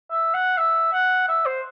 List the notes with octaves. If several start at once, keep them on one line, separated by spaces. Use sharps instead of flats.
E5
F#5
E5
F#5
E5
C5